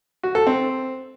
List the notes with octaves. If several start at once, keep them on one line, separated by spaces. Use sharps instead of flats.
F#4
A4
C4